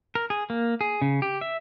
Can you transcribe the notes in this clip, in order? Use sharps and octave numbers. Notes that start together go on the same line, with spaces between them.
A#4
G#4
A#3
G#4
C#3
G4
E5